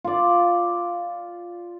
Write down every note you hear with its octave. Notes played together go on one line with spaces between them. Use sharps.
F4 D5